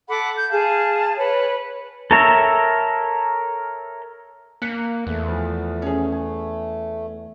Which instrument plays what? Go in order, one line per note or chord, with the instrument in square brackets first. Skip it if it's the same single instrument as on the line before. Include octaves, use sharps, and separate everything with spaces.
[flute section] A4 F#5 B5 D6
G6
G#4 F5 A5
B4 C#5
[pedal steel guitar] A4 A#4 C#5 E5 A#5
[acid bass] A#3 [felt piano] F#6 B6 C#7
[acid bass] E2 [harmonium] A3
[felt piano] F3
C#4 G#4
G#5